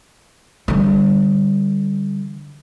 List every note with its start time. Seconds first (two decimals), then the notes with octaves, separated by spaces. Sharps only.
0.68 D3 G3